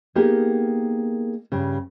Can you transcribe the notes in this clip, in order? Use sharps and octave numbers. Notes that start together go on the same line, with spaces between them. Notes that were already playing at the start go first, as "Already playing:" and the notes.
A#3 B3 D#4 G4 G#4 A#4
G2 C#3